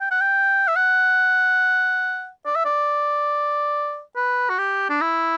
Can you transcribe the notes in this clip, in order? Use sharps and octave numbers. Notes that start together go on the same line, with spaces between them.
G5
F#5
G5
E5
F#5
D5
E5
D5
B4
F#4
G4
D4
E4